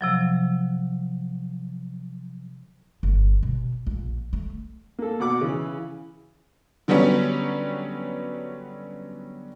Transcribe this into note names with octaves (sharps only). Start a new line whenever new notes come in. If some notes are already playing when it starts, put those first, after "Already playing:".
C3 F3 F#3
G1
B2
A#1
A3
A#3 A4
B2 F#5 D6
C#3 E3
D3 F#3 G3 B3 C#4